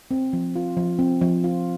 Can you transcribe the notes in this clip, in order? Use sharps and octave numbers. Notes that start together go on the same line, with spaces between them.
C4
F3
F4
F3
C4
F3
F4